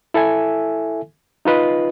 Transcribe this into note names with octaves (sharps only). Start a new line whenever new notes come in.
E4 A4 E5 G#5
D#4 F4 B4 D#5